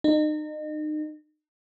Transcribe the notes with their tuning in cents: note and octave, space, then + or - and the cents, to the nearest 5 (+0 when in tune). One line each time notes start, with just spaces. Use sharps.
D#4 -35